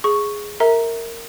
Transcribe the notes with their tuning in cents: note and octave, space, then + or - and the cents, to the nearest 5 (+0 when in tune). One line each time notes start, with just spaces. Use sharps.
G#4 +0 C#6 +0
A#4 -15 E5 -20 A#5 +0